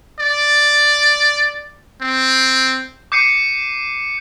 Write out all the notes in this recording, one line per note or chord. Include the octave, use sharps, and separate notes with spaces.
D5
C4
D6 G6 C7 C#7 D#7